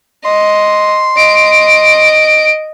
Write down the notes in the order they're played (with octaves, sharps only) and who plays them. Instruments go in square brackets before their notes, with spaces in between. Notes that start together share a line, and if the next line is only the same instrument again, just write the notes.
[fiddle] D#5 [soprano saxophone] C6
[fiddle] D#5 [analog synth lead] D7